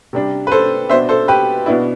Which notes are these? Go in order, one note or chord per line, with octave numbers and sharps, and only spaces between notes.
C3 G3 D4
B4
A4 C5
B2 B3 D4 C5 E5
A4 C5
G4 B4
B2 B3 D4 E4